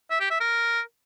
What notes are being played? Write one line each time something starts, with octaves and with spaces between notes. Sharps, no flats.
E5
G4
E5
A#4